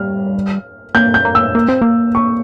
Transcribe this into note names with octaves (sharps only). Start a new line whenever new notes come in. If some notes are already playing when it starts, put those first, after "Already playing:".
Already playing: G3 F6
A#3 G6
G6
A#3
E6
A#3
C4
A#3
C#6